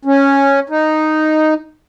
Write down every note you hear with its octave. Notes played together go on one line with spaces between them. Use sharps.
C#4
D#4